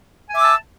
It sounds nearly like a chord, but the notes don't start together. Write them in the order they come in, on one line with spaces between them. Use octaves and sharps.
G#5 E5 D6 E6 A5